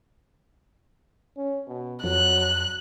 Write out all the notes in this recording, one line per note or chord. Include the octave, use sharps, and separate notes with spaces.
C#4
B2
F2 F#3 F#6